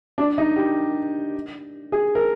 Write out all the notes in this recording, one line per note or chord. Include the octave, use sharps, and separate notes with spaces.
D4
D#4
G4
G#4
A#4